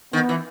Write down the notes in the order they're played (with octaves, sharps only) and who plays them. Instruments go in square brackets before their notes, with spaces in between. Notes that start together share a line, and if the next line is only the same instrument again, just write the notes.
[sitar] D#3 [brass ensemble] B3
[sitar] E3